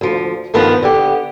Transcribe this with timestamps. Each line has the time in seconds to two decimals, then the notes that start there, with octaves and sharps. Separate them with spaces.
0.01 D2 F3
0.54 G2 D#3 F3 B3 A5
0.83 D3 B3 G4